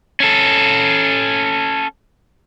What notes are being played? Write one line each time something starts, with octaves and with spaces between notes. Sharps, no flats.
C#4 A4